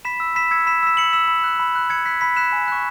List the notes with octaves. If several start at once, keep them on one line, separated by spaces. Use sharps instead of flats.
B5 B6 E7
E6
B5 B6 E7
E6 G#6 C#7
B5 B6 E7
E6 B6 E7
B5 C#7 F#7
E6 B6 E7
B5
F#6
B5
F#6
B5 G#6 C#7
F#6 B6
B5 B6
F#6 B6 E7
G#5
C#6 F#6